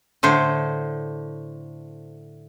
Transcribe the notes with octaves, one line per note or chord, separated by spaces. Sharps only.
A2 D3 C5